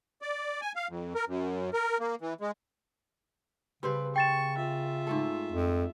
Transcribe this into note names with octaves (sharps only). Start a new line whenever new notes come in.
D5
G#5
F5
F2
A#4
F#2
A#4
A#3
E3
G#3
C#3 G3 C4 B4 C5
G5 C#6 A6 E7
F4 E5
G#2 A3 A4
F2